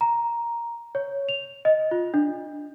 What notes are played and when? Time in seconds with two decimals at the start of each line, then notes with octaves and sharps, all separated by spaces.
0.01 A#5
0.95 C#5
1.29 F7
1.65 D#5
1.91 F4
2.14 D4